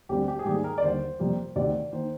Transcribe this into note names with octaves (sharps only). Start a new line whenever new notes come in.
D2 D3 G3 C4 G4
G4
G#4
G#2 D#3 G3 A#3 G4
G#4
A#4
D5
D#2 D3 G3 C5
F2 C3 G3 A#3
D2 C3 D#3 D5
D#3 A#3 C5